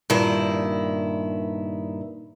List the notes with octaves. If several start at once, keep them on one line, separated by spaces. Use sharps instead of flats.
G2 A#2 D#3 E4